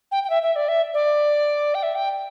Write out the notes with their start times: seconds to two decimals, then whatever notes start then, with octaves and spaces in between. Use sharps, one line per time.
0.11 G5
0.23 G5
0.30 E5
0.43 E5
0.56 D5
0.68 E5
0.94 D5
1.75 G5
1.83 E5
1.95 G5